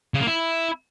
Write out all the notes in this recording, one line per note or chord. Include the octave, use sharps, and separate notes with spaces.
C#3
A#3
E4